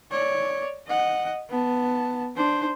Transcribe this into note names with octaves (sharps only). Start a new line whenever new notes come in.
C#5 D5
D#5 F#5
B3 A5
D4 C5